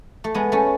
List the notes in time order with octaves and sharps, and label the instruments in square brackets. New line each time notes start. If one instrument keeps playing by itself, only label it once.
[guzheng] A3
G#3 B3
A3 C#4